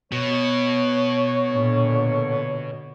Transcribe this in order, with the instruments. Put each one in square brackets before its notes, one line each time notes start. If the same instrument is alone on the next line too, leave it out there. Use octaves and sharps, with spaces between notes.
[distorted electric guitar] B2 [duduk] C#5
[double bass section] A#2 D3